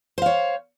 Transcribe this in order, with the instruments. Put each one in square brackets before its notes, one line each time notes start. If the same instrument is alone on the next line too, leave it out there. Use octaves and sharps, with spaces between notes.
[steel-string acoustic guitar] C5
F5
C#5